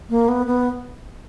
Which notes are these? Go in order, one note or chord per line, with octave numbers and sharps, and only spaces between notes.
A#3
B3
B3